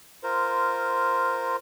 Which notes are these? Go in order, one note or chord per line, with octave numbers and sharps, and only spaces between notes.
F4 A#4 C5